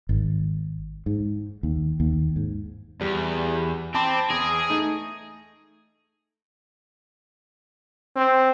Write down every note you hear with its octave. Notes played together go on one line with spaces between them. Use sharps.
G#1
G#2
D#2
D#2
G#2
E2 G3
C4 A5 B5 D6
E2 G#4 A#6 D7
A3 D#4
C4